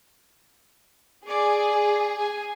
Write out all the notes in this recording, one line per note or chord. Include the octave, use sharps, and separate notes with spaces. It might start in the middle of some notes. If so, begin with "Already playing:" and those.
G#4 D5 D6
G#5